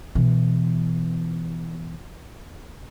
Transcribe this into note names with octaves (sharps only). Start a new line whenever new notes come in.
B2 E3